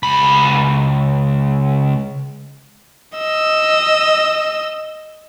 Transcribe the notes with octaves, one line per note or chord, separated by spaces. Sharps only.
C#2 B5
D#5 E6